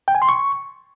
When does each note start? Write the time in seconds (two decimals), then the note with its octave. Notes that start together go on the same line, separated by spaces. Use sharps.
0.08 G5
0.15 G#5
0.22 C6
0.29 C#6